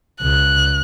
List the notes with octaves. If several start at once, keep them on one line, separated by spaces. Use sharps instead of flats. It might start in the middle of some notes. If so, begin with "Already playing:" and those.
C#2 F#6